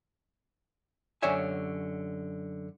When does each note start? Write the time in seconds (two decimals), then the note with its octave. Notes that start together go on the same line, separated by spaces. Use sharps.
1.22 F#2 D3 G4 C#5 E5 G#5